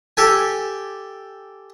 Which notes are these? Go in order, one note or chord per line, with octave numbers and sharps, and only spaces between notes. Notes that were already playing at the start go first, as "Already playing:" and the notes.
G4 A4 G#5